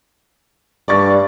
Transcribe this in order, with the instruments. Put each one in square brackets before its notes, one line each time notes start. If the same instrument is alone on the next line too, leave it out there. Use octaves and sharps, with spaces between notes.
[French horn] G2 [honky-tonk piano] D5 C#6 A6